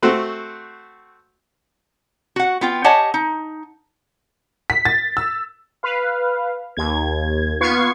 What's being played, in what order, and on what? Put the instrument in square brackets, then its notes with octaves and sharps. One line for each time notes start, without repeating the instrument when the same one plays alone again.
[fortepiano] A3 C4 F#4 C5
[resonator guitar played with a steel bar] F#4 F#5
B3 F4 G5
G4 C#5 D#5 F#5 G#5 A5
D#4
[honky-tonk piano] B6
A6
E6
[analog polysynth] B4 F5
D#2 G#6
B3 F4 C#6 G#6 C7